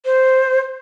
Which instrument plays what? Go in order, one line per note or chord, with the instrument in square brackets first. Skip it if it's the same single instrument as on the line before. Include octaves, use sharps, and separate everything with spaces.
[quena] C5